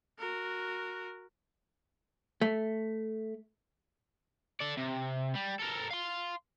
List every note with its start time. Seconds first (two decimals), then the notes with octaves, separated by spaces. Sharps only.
0.19 F#4 A#4
2.42 A3
4.60 A4 D5
4.77 C3
5.35 G3
5.59 A4 A#4
5.91 F5 C6